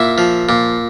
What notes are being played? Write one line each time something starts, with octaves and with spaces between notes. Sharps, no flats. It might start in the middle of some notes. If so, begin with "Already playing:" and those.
Already playing: A#2 E4
F3
A#2